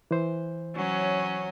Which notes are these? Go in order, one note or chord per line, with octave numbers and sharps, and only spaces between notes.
E3 C5
F#3 C#4